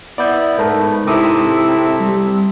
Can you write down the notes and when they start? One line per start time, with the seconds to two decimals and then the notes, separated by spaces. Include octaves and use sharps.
0.18 B3 E4 D5 G6
0.59 G#2 A3 A#4 B4
1.07 C3 C4 E4 A4 A#5 D6 D#6
2.00 G3